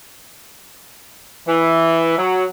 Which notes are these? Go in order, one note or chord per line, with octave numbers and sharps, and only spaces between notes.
E3
F#3